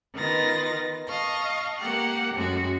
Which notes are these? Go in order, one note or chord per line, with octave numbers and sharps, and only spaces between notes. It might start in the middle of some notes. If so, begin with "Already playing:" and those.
D#3 B3 F4 A6 A#6
D#5 F5 A5 C#6
A#3 G4 F#5
F#2 G#3 A3 F#4